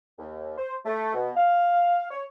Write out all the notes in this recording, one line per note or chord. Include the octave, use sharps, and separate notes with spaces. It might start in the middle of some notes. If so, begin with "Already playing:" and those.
D#2
C5
A3
B2
F5
C#5